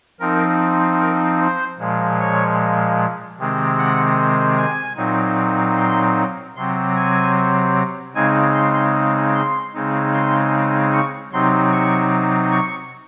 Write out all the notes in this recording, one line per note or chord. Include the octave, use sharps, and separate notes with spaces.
F3 C4 D#4 A#4
A#4
C5
A#2 F3 G#3
C#5
C3 D#3 G#3 C4
F#5
G#5
A#2 F#3 C4 D#4
C6
C3 F#3 C4 C6
G#5
C#3 G#3 C4 D#4 G#5
C6
C6
C#3 G#3 C4 D#4
C6
C#6
C3 F#3 C4 D#4 C6
C#6
C#6